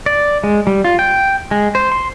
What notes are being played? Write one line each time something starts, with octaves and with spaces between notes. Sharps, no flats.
D5
G#3
G3
F4
G5
G#3
C5
C6